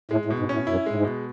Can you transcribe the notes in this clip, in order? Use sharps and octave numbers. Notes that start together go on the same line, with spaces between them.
A2 G#3
A2
B2
G#2
A2 C#4
F#2 E4
A2 G#3
G#2
B2